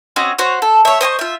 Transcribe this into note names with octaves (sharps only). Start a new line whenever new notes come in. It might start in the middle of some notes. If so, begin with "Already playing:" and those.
C4 C#4 F#4 D#5
F#4 C5 C#5
A4
C#5 E5
C5 D#5 G#5 C#6
F4 E5